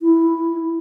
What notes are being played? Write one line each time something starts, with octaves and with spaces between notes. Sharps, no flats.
E4